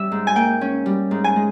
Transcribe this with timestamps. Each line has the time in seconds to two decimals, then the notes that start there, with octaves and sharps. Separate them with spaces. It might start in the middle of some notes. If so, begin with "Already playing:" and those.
Already playing: G3 C#4 E5
0.12 G#2
0.27 G#5
0.36 A#3 G5
0.61 C#4
0.86 G3
1.11 G#2
1.24 G#5
1.36 G#3